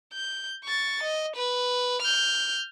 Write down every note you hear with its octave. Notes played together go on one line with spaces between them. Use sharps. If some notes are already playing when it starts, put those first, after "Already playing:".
G6
C#6 A6
D#5
B4
F6 G6